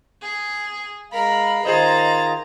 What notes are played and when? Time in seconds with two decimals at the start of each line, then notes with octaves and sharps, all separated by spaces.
0.22 G#4
1.12 G#3 A#4 F5 B5
1.65 D#3 F4 G#4 C5 D#5 A#5 A6